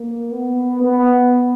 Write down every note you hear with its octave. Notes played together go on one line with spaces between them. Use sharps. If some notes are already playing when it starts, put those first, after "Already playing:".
Already playing: A#3
B3
B3